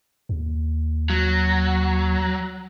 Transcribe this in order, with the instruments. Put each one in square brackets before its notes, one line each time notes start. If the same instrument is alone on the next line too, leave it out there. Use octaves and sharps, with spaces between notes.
[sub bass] D#2
[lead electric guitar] F#3